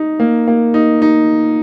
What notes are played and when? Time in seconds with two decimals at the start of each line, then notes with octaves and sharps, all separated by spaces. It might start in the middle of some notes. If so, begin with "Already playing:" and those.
Already playing: D#4
0.20 A#3
0.47 A#3
0.74 D#4
1.02 D#4